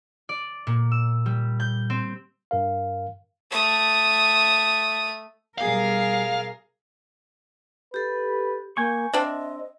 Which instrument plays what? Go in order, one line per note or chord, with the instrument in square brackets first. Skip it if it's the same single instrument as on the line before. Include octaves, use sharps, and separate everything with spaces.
[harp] D5
A#2
E6
G3
G6
C4
[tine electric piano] G2 A#4 F5
[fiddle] A3 D#6
[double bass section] B2 G3 [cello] G#4 A#4 [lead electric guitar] F5
[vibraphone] G4 A4 [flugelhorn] B4
[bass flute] A#3 [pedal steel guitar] G5 G#5 C#6
[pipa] C4 D4 [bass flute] D#5 [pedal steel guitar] E5